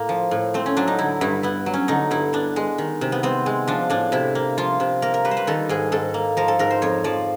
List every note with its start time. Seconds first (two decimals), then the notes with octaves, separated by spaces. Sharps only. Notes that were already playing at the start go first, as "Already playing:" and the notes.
Already playing: A2 A#3
0.09 F3
0.31 A2
0.54 A3 C4
0.66 C#4
0.76 F#3 D4
0.88 D#4
0.99 D3 E4
1.21 G2 E4
1.43 B3 E4
1.66 F#3
1.74 C#4
1.88 D3 D#4
2.11 G2 E4
2.33 B3 D4
2.56 G#3
2.78 D#3
3.01 C3
3.12 B3
3.23 B3 C4
3.46 G#3
3.67 F3 D4
3.90 A2 D4
4.12 C3 E4
4.35 A#3
4.58 F3 F4
4.80 C3
5.02 A#3 A#4
5.14 A#4
5.25 G3 B4
5.31 C5
5.37 B4
5.47 D#3 A4
5.69 G#2 G#4
5.92 G#2 A4
6.14 A#3
6.37 F3 A#4
6.48 A4
6.59 G#2 A#4
6.70 C5
6.82 F2 C#5
7.04 F3 D5